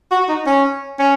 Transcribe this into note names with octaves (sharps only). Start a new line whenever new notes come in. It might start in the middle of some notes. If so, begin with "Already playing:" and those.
F#4
D#4
C#4
C#4